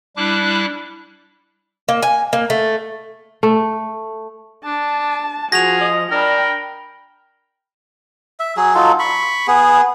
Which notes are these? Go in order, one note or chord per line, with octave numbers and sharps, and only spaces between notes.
G3 D4 E4 D6 F#6
A#3
G#5
A#3
A3
A3
D4 A5
F3 F#4 G#4 A#6 F7
D#5
D4 A#4 G5 B5
E5
F#3 G#4
F#3 D#4 F4 A4
B5 C#6
B3 G#4